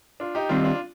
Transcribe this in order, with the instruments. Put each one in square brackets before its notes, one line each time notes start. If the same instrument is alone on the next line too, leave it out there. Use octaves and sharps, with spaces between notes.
[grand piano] D4 F4
D#4 G4
[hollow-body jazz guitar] D#3 G3 C4 D#4 [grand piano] D4 F4
[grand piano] D4 F4